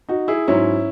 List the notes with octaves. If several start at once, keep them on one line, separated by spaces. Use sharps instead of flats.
D#4 F#4
E4 G#4
G#2 F#3 C#4 E4